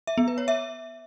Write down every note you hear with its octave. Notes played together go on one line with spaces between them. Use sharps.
E5
B3
B4
C#5
E5